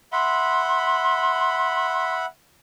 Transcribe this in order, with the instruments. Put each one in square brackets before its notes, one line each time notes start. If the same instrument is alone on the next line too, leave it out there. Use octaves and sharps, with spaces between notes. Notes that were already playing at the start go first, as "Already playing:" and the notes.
[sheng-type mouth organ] E5 F#5 B5 [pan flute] C6